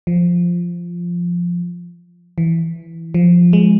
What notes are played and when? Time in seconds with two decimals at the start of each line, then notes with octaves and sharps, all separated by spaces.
0.07 F3
2.38 E3
3.14 F3
3.53 G#3